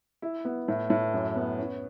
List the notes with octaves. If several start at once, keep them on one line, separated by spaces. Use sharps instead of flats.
E4
B3
A2
A2
F#2
B3
C#4